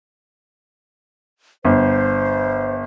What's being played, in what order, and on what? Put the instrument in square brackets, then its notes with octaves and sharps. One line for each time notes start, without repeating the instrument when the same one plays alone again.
[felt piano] G1 [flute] C5